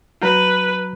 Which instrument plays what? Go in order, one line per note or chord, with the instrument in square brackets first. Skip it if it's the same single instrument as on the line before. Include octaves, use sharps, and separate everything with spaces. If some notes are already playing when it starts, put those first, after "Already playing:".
[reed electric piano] F#3 A#5 G6 [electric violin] B4